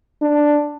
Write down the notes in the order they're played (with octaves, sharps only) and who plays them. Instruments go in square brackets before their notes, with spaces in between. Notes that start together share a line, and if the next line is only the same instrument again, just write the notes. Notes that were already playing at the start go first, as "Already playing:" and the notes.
[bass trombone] D4